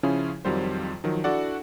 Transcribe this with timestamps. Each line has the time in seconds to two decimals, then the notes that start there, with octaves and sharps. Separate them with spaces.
0.03 C#3 F3 C#4 E4 F4 G#4
0.45 F2 D#3 F#3 G3 F4 C5
1.04 D#3 F3 F#3
1.24 D4 E4 F#4 A4 D5 F#5